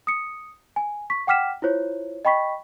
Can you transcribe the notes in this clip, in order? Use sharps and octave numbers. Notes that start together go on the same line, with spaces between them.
D#6 C#7
G#5
C#6 B6
F#5 G5 D6 F6 B6 E7
E4 F4 C5 C#5
D#5 G5 B5 C#6 B6